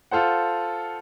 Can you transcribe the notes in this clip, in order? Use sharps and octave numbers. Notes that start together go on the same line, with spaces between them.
F4 A4 C5 F#5